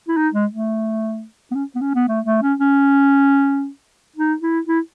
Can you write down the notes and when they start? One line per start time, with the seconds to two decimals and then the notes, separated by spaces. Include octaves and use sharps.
0.08 E4
0.17 D#4
0.34 G#3
0.51 A3
1.51 B3
1.55 C#4
1.75 B3
1.81 C#4
1.95 B3
2.08 A3
2.25 A3
2.42 C#4
2.60 C#4
4.16 D#4
4.42 E4
4.67 E4